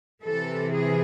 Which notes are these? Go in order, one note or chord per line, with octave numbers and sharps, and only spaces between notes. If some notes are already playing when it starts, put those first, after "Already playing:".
C3 E3 A4
G#4